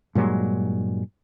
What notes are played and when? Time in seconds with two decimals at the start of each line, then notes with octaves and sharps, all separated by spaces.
0.15 G2 A#2 F#3 G#3